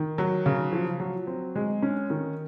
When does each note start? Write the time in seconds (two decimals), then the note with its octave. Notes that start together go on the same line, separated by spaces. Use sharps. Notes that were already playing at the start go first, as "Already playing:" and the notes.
Already playing: D#3
0.18 F#3
0.46 C#3
0.73 F3
1.00 F#3
1.27 C4
1.56 G#3
1.82 C#4
2.10 D#3